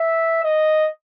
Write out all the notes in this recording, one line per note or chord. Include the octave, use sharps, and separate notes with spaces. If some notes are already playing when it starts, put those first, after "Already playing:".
Already playing: E5
D#5